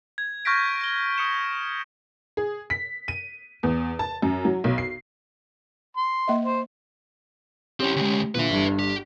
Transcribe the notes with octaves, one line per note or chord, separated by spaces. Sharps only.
G#6
C#6 F6 G6 A#6 B6 D7
D7 G7
D#6 C#7 E7
G#4
B6
D#7
E2
A5
F#2
F#3
B1
C7
C6
A#3 D#5 E5
C5
C4 C#4 E4 G4
D2 G#3
A#2 D3 B4 E5
G1 G2
G4